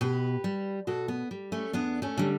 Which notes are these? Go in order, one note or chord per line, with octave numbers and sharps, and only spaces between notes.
B2 G4 B4
G3
B2 F#4 A4
B3
G3
A3 C#4
E2 B3 D4
A3 C#4
D3 G3